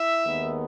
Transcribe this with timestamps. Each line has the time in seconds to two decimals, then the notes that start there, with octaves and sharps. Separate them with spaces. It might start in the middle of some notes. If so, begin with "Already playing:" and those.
Already playing: E4 E5
0.25 D#2 D#3 G#3 B3 D#4